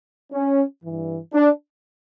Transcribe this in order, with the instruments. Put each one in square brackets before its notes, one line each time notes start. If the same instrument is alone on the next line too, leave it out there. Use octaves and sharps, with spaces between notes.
[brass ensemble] C#4
G2 E3
D4